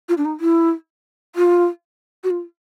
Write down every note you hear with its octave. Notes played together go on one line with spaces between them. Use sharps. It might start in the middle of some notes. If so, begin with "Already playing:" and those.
F4
D4
D#4
E4
F4
F#4
F4